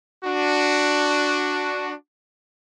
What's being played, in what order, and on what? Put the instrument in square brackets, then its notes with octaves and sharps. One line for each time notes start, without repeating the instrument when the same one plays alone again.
[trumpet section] D4 F#4